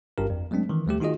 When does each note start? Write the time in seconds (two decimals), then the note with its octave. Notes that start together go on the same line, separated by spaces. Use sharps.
0.18 G1 G2 G4 A#4
0.30 F2
0.51 F#3 G#3 A3 C4 D4
0.69 D#3 E3
0.86 D2 G3 A3 G4
1.01 D#3 D#4 F4 F#4 G#4 D#5